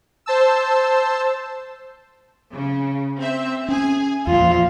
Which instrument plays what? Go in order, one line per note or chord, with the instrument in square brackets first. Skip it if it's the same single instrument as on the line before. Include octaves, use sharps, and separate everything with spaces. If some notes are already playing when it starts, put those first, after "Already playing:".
[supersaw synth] C5 A5 E6
[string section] C#3
C4 E5
[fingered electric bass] C#4 [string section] G#4 G#5
[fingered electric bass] E2 [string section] A#2 F3 [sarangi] F4